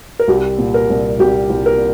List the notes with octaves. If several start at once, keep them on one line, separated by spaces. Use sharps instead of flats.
A#4
C2 G4
A#2
A#4
C2
C2 G4
C2
A#4